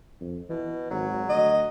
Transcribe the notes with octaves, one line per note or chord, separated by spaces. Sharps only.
F2
B2 E3
G#1 F#3
D2 D#5